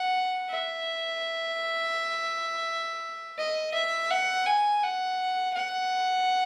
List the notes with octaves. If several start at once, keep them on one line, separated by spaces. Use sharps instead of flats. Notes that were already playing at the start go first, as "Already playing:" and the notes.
Already playing: F#5
E5
D#5
E5
F#5
G#5
F#5
F#5